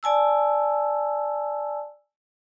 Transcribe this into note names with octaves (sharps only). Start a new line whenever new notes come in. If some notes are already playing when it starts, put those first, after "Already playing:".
D5 G#5 A5 E6